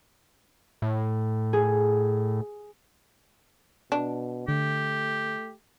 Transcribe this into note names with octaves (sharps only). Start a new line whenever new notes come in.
A2
G#4
B2 D4
D3 A3 G4